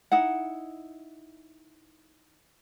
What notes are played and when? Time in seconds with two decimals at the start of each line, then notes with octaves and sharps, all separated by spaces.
0.12 D#4 E4 F#5